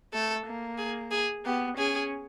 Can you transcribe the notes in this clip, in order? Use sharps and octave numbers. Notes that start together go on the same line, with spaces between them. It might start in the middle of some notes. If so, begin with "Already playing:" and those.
A3 A4
A#3
G#4
G#4
B3 G4
C#4 G#4